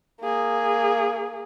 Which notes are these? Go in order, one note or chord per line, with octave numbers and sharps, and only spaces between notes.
A#3 G#4